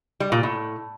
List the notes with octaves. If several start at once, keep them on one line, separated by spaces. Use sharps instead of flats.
G3
A#2
A2